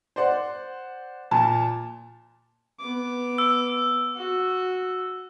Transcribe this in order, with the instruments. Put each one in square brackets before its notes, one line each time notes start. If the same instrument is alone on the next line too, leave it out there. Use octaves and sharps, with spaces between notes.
[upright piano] C5 D5 F#5
[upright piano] A#2 [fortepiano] A5
[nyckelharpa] B3 D6
[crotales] E6
[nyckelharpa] F#4